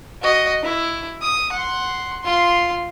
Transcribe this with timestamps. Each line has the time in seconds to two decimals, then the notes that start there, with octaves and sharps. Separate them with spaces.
0.22 F#4 D#5
0.63 E4
1.22 D#6
1.52 F#5 C6
2.23 F4 C6